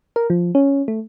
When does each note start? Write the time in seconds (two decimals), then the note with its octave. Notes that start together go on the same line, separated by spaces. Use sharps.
0.16 A#4
0.30 F3
0.55 C#4
0.88 A3